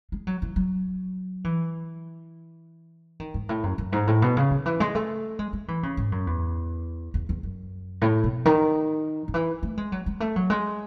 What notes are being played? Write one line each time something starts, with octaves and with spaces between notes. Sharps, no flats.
G#3
F#3
E3
F#3
E3
D#3
G#2
A2
F#2
F#2
G#2
A2
B2
C#3
D#3
E3
G#3
A3
G#3
G#3
E3
C#3
G#2
F#2
E2
E2
E2
F#2
A2
B2
D#3
D#3
E3
A3
G#3
F#3
G#3
A3
F#3
G#3